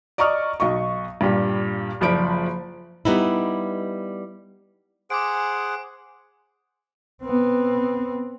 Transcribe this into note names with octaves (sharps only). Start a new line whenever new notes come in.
D5 D#5 A#5 C#6 D#6 F6
B1 D#5 C#6
G2 A#2 G3
F#1 F3 D5 B5 D7
G3 B3 D#4 E4
G#4 C5 F#5 D6 D7
B3 C4